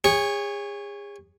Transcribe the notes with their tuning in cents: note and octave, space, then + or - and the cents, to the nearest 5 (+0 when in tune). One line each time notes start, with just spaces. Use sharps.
G#4 -35 C#5 +0